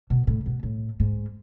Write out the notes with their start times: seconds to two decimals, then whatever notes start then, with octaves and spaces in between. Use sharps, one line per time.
0.10 B2
0.27 A2
0.46 B2
0.63 A2
1.00 G#2